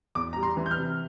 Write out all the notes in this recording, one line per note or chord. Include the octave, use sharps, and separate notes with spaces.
E2 D6
G3 A#5
C6
E3
G6
F6
C3